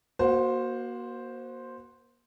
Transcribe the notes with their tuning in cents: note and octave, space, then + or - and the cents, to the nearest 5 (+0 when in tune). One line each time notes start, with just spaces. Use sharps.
A#3 +35 F#4 +0 C5 +0